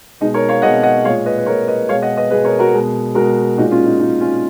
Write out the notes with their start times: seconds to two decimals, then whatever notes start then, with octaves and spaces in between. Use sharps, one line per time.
0.20 B2 G#3 D#4
0.34 A#4 C#5
0.49 C#5 F5
0.62 B2 G#3 D#5 F#5
0.83 D#5 F#5
1.04 G#3 C#5 F5
1.08 A#2
1.26 B4 D#5
1.38 B4
1.46 A#2 G#3 A#4 C#5
1.67 B4 D#5
1.89 B2 G#3 C#5 F5
2.02 D#5 F#5
2.17 B4 D#5
2.30 G#3 G#4 B4
2.34 B2
2.44 A#4 C#5
2.59 F#4 A#4
2.73 B2 G#3
3.15 B2 G#3 F#4 A#4
3.58 A#2 G#3 D#4 F#4
3.71 C#4 F4
3.85 D#4
3.99 A#2 G#3 D#4
4.21 C#4 F4